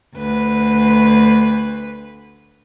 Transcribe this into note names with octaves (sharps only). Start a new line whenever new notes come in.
D2 B4